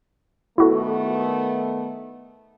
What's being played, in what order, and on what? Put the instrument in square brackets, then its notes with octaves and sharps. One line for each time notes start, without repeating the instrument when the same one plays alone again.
[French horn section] D#3 A3 B3 [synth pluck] E4 F#4 A4